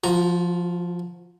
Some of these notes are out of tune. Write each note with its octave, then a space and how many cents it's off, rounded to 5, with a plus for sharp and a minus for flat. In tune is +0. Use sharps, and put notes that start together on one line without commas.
F3 +0 F#4 -40 A#5 +0